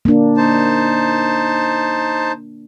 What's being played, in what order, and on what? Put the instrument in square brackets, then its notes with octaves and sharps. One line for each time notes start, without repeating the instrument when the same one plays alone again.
[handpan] A#3 D4
[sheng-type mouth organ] D#4 C5 A5